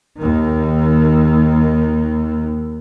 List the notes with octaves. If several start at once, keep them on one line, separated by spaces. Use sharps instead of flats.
D#2 D#3